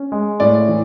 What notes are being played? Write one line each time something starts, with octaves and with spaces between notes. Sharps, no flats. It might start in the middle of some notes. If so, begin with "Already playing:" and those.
Already playing: C#4
G#3
A2 D5
E3